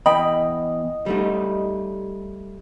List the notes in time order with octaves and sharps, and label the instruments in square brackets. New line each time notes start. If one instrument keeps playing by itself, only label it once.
[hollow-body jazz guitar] E2 [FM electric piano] D#5 [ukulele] G5 B5
[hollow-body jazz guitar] G3 A3 D#4